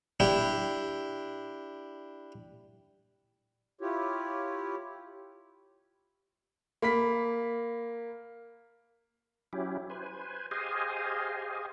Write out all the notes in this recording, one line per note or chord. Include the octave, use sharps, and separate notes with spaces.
D4 E4 G4
E4 F4 G4 C#5
A#3 B5 B6
F#3 C#4 E4 G4
B4 C5 G#5
G4 G#4 C5 D#5 F5 G#5